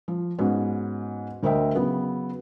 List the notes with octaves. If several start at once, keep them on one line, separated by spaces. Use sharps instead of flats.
F3
G#2 B3 C#4 F#4
D2 A#4 C5 D#5 E5 G5
C#3 F#3 B3